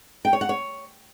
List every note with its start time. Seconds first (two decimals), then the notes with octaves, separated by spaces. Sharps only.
0.25 G5
0.33 C#5
0.41 F#5
0.49 C#5